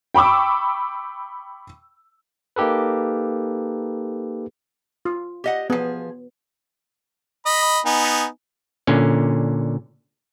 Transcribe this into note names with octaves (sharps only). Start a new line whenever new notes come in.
G5 B5 C#6 D6 E6
A#3 D#4 G4 A4 B4
F4
G4 D#5 F#5
F3 B3 G#4
D#5 B5
B3 D#4 G#5
A#2 D3 C#4